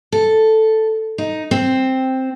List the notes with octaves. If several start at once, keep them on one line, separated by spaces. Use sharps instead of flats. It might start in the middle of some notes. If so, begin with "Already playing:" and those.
A4
D#4
C4